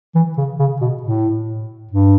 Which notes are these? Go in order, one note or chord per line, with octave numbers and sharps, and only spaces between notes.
E3
C#3
C#3
B2
A2
G2